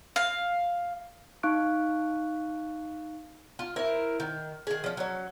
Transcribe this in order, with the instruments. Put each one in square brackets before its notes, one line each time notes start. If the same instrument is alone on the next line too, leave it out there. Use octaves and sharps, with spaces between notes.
[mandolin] F5
[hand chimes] D#4 F5 C#6 F#6 D7
[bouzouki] F4
E4 A#4 C5
D#3
D#3 G#4
F3 C#4
F#3 C#4